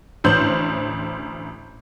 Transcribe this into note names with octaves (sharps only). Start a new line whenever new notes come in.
A1 D2 C5 G6 F#7